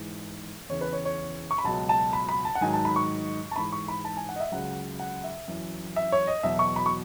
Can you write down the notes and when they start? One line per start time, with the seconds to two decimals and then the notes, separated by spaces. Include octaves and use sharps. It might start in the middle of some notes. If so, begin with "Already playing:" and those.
Already playing: G#2 E3
0.69 E2 C#3 E3 C#5
0.81 B4
0.93 C#5
1.05 C#5
1.51 C#6
1.58 B5
1.64 C#2 B2 F#3 A5
1.89 A5
2.13 B5
2.29 B5
2.45 A5
2.55 F#5
2.61 G#2 D#3 F#3 G#5
2.73 A5
2.85 B5
2.96 C#6
3.51 A5
3.56 G#2 E3 B5
3.72 C#6
3.88 B5
4.05 A5
4.17 G#5
4.29 F#5
4.36 D#5
4.40 E5
4.52 C#2 C#3 F#3 F#5
5.00 F#5
5.24 E5
5.48 F#2 E3
5.96 E5
6.12 C#5
6.27 D#5
6.43 E2 B2 F#3 E5
6.59 C#6
6.76 B5
6.86 C#6